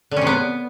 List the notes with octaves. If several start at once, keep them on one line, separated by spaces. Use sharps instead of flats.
D3
C#4
C3
B3